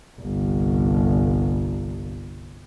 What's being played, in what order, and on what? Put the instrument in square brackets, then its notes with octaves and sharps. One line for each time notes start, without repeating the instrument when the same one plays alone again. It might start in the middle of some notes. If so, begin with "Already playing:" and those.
[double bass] G1 C2